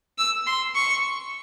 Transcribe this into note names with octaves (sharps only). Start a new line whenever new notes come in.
E6
C6
C#6